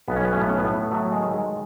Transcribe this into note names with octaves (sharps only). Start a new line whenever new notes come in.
B1 B3
C#4
B3
A2 C#4
B3
C#4
B3
A2
F#3 A3
G#3
D#3
G#3